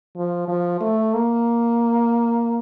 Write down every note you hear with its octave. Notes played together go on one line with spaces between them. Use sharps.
F3
F3
A3
A#3